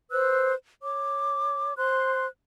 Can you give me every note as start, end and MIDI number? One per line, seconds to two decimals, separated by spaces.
0.11 0.53 71
0.11 0.53 72
0.11 0.53 88
0.11 0.53 90
0.81 1.72 73
0.81 1.72 86
1.77 2.26 72
1.77 2.26 84
1.77 2.26 90